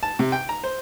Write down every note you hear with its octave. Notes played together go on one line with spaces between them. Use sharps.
A5
C3
G5
A#5
C5